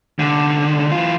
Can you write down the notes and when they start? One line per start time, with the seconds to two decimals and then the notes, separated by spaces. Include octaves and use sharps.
0.19 C2 D3
0.92 E3 F4